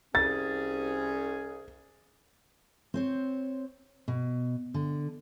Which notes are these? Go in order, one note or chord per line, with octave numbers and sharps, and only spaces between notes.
C2 C#4 G#4 A6
C4 C5 C#5
B2
D3